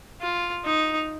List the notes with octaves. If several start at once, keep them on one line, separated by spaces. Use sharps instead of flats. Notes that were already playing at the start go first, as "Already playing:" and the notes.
F4
D#4